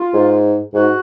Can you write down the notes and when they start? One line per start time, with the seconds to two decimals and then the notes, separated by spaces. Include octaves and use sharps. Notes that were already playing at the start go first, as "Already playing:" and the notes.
Already playing: F4
0.14 G#2
0.74 G#2 F#4